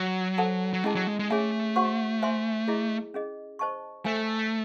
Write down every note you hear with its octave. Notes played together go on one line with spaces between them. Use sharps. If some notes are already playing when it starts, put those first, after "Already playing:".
Already playing: F#3
A4 C5 F#5 A5
F#3
G#3 C#4 E4 G#4 D#5 A5
F#3
G#3
G#3
A3 C#4 G#4 C#5 E5 G#5
F#4 C5 F#5 C#6
C5 E5 G#5 C6
E4 G#4 D#5
C#4 G#4 D#5
C5 D#5 A5 C#6
A3 C5 E5 G#5